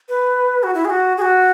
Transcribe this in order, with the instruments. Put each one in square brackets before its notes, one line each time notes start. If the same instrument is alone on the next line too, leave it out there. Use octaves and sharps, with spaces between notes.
[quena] B4
F#4
E4
G#4
F#4
G#4
F#4